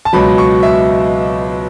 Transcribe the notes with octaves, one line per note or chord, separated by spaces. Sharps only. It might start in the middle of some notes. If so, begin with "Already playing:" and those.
A5
C#2 B2 F#3 B5
C#6
E5